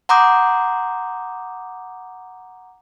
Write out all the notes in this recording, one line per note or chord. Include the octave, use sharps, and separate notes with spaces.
F#5 A#5 C6 D6 D#6 G6